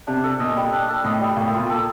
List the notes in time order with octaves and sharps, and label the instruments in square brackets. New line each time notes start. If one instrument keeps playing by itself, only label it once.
[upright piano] C3 [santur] D4
[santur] A4
[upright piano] A#2 [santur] D#5
[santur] G3
D4
A4
[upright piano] A2 [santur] D#5
[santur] G3
[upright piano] A2 [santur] A#3
[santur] F4
[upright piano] A#2
[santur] A4